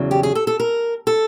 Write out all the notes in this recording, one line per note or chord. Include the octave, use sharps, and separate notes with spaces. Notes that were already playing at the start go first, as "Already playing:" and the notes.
Already playing: E2 C#3 F#3
G4
G#4
A4
A4
A#4
A4